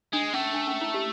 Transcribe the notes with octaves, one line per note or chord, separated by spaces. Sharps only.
G#3 D4
A3 C#4
D4
C#4
E4
G4